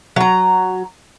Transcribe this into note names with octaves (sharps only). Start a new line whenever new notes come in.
F#3 A#5